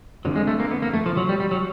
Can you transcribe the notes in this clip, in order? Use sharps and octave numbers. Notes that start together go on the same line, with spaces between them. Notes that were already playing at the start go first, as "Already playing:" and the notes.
F2 D3 F3 F#3
G#3
A3
A#3
B3
A#3
A3
F3
F#3
G3
G3
F#3